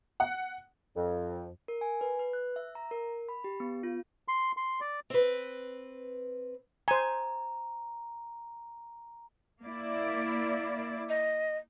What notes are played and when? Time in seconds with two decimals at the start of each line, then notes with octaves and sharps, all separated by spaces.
0.20 F#5
0.96 F2
1.68 A#4
1.81 G#5
2.01 B4
2.19 B4
2.33 F#6
2.56 E5
2.75 A#5
2.91 A#4
3.29 B5
3.44 G4
3.60 B3
3.83 F4
4.28 C6
4.57 C6
4.81 D5
5.10 C4 B4
6.88 C5 G#5 A#5
9.62 A#3 E4 D5
11.09 D#5